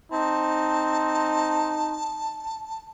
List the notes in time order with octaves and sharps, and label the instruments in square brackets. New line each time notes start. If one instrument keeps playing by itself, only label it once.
[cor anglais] C4 [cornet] D#4 [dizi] A5